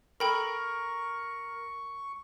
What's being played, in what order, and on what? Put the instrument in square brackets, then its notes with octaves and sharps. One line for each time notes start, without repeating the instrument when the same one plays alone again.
[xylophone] A4 G5 B5 [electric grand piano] A#4 [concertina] C#6